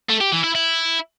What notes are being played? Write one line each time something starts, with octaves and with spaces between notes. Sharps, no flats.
A3
G4
E3
E4
E4